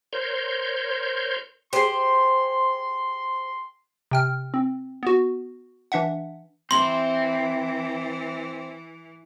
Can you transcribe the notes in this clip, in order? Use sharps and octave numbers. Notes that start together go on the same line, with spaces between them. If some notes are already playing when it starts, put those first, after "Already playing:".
A#4 C5 C#5 C6 G6
G4 G#4 C5 C6
C3 G5 F6
C4
B3 F#4
E3 D4 E5 F#5
E3 C4 E4 C6 F#7